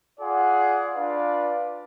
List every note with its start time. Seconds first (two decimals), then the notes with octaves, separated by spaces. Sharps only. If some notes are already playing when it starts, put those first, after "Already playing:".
0.19 F4 G#4 D5 F#5
0.94 D4 F4 B4 D5 F5